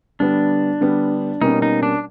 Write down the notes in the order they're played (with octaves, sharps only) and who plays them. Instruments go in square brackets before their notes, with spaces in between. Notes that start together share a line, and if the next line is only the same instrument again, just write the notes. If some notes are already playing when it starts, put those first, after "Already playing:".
[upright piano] D3 G3 B3 [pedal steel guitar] D4
[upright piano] D3 G3 B3
[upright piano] B2 G3 A#3 C#4 [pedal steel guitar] D#4
[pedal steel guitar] D#4
D4